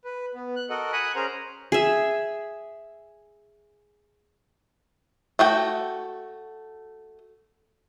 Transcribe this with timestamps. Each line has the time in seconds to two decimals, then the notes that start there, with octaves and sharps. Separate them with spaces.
0.04 B4
0.35 B3
0.56 F#6
0.70 F#4 A4 A#4 D#5 F#5
0.93 F#5 G#5 B5 D#6 F#6
1.15 C#4 G#4 A#4 C5 A#5
1.72 G#4 E5
5.39 A3 F#4 G5